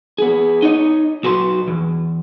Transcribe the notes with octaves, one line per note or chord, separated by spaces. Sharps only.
B3 G#4
D#4 C#5 D#5
B1 F#4 B4 C6
E2